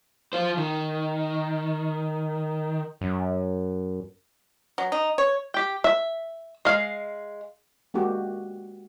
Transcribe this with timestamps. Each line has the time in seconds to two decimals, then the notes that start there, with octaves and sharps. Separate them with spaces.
0.33 F4 C5
0.57 D#3
3.01 F#2
4.78 F#3
4.92 D#4
5.18 C#5
5.54 G4 G5
5.84 E5
6.65 G#3 F5
7.94 G#3 A#3 D4 F#4 G4